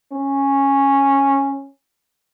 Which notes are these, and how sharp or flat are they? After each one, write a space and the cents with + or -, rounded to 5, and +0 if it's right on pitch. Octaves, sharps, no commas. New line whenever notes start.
C#4 -10